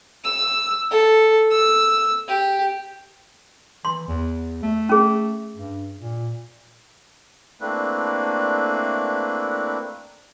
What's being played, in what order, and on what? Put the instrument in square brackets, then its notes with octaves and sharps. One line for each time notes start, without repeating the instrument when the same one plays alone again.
[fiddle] E6
A4
E6
G4
[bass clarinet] E3 [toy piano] C6
[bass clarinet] E2
A3
[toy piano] C#4 G#4
[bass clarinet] G2
A#2
[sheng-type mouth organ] A3 A#3 C4 D4 E4 B4